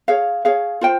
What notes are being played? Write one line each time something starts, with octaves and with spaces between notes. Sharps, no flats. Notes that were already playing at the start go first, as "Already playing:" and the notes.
G#4 C#5 F5
G#4 C#5 F5
F4 C5 G5